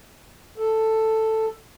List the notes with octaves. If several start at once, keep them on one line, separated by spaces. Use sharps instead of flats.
A4